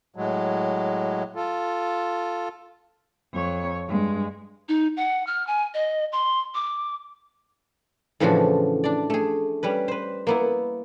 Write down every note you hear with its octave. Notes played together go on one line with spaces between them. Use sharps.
A2 F#3 G#3
F4 A4
F2 C#5
G2 G#3
D#4
F#5
F6
G#5
D#5
C6
D6
A2 C#3 E3 F3 D4 F#4
D4 D5
A3 G#4
G3 C#4 B4
B4 C5
A#3 B3 E4